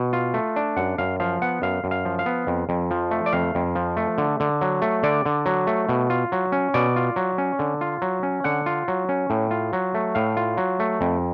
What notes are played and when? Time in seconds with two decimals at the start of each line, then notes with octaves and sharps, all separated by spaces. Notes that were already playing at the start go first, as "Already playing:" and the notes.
Already playing: B2
0.13 F4
0.34 A3
0.56 D4
0.77 F#2 F#5
0.98 F#2 F5
1.20 F3 F5
1.42 B3 F#5
1.62 F#2 F5
1.84 F#2
1.91 F5
2.05 F3
2.19 F5
2.26 B3
2.47 F2
2.69 F2
2.91 F3
3.11 A3
3.26 D5
3.33 F2 F5
3.55 F2
3.75 F3
3.97 A3
4.18 D3
4.40 D3
4.61 F#3
4.82 A3
5.03 D3 D5
5.25 D3
5.46 F#3
5.67 A3
5.89 B2
6.10 F4
6.32 F#3
6.52 C#4
6.74 B2 D5
6.96 F4
7.16 F#3
7.38 C#4
7.59 D3
7.81 F4
8.02 F#3
8.23 C#4
8.44 D3 F#5
8.66 F4
8.88 F#3
9.09 C#4
9.30 A2
9.51 F4
9.73 F#3
9.95 A3
10.15 A2 F5
10.37 F4
10.57 F#3
10.80 A3
11.01 F2